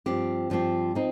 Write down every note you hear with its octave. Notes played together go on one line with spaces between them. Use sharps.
G2 F3 C4 G4
G2 F3 C4 G4
F3 C4 D#4